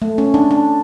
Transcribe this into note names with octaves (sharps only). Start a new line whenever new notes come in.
A3
C#4
D4
D4